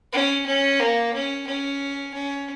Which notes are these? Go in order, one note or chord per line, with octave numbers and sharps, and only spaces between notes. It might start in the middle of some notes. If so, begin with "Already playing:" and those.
C#4
C#4
A#3
C#4
C#4
C#4